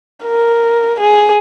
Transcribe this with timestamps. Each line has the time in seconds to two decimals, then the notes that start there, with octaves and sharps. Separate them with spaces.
0.25 A#4
1.00 G#4